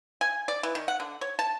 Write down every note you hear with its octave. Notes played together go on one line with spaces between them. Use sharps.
G#5
D5
E3
D#3
F#5
D3
C#5
A5